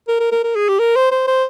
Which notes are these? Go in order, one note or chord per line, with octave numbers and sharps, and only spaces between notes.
A#4
A#4
A#4
A#4
G#4
G4
A#4
C5
C5
C5